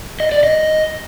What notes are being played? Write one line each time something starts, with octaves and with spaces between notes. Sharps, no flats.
D#5
D5
D#5